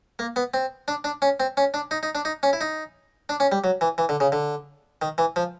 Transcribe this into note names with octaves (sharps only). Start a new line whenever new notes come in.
A#3
B3
C4
D4
D4
C#4
C4
C#4
D4
D#4
D#4
D4
D#4
C#4
E4
D#4
D4
C#4
G3
F#3
E3
E3
D3
C#3
D3
D#3
E3
F3